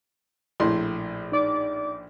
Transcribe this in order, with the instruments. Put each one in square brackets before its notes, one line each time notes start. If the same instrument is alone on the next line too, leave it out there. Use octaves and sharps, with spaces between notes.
[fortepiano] A#1 A2 C6
[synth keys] D#4 D5 D6